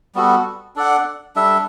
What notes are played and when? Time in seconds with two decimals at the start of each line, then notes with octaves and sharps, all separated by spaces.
0.15 G3 B3 F#4 A4
0.76 D4 A4 D5 F#5
1.36 G3 D4 A4 E5